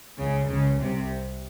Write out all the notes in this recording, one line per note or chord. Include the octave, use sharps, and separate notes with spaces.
C#2 C#3
C#2 C#3
C2 C3